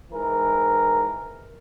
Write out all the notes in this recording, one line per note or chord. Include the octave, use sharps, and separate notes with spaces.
G#2 E3 A#4